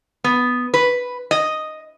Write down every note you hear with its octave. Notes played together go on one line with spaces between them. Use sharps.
B3
B4
D#5